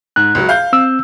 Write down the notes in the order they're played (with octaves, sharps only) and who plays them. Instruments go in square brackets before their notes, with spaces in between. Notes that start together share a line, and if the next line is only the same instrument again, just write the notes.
[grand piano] G#2 [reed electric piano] F#6
[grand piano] C#2 F#3
F5 G6
[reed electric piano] C4 E6